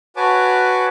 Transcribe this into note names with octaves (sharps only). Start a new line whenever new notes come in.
F#4 B4 C#5 G#5 A5 D6